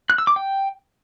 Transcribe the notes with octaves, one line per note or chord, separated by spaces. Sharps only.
F#6
E6
D6
G5